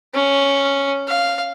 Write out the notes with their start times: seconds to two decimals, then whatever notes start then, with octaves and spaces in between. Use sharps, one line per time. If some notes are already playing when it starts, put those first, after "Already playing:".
0.14 C#4
1.07 F5